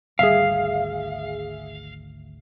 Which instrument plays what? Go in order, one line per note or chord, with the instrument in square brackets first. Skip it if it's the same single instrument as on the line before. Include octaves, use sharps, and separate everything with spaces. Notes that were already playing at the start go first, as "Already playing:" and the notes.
[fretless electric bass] G#1 D2 G3 [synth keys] G#4 E5 [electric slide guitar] F5